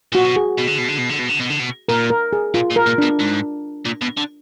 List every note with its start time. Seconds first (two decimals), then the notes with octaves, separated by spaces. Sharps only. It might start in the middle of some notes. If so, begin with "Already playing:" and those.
0.13 A#2 F#4
0.25 B2
0.36 G#4
0.58 B2
0.68 D3
0.79 B2
0.89 D3
0.98 B2
1.09 D3
1.19 B2
1.29 D3
1.40 B2
1.50 D3
1.59 B2
1.89 A#2 A#4
2.10 A#4
2.33 G#4
2.54 A#2 F4
2.70 A#2
2.76 A#4
2.86 A#2
2.98 B2 D4
3.20 G#2
3.85 A#2
4.01 B2
4.17 D3